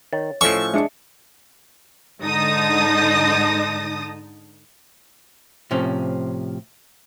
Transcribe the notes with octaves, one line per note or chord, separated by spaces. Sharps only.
D#3 C#5 A6
A2 F3 C#4 A4 D#5 C#6 E6
G#3 D4 E5 C#7
G#2 D3 D#4 A5 D#6 A#6
A2 C3 F3 C#4